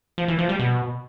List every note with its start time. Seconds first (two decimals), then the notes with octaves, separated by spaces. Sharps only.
0.18 F3
0.28 E3
0.39 F3
0.49 G3
0.59 B2